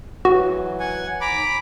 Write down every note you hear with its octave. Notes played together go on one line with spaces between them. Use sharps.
E3 F#3 F#4
F#5 G#5
D#2 G#5 A#5 B5 D6